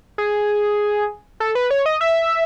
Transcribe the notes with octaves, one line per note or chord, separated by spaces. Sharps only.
G#4
A4
B4
C#5
D#5
E5